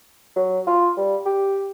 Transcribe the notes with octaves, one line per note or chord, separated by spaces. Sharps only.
F#3
F4
G3
G4